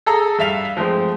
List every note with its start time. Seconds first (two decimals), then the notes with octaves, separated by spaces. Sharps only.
0.06 G#4 A4 A#5
0.39 G2 E5 F5 F7
0.77 F3 G#3 A3 C4